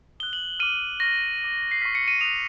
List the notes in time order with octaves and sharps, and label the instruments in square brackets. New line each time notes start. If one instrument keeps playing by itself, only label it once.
[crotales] D#6 F#6 G7
F#7
D6 F6 D#7
C#6 F6 A#6
D6 F6
C7
C#6 F6 B6
C#7
D#7
D#6 F#6 F7